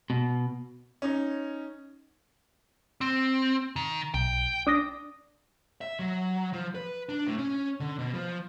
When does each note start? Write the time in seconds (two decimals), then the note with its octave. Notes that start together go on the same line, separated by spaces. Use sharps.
0.10 B2
1.02 C#4 D#4
3.01 C4
3.76 D#3
4.14 B1 G5
4.67 D4 D6 D#6 A#6
5.81 E5
5.99 F#3
6.53 F3
6.75 B4
7.09 D4
7.27 A2
7.38 C#4
7.80 D3
7.99 B2
8.14 F3